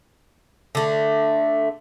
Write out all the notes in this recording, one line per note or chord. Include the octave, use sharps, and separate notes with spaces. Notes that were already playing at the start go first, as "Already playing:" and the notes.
D3 A3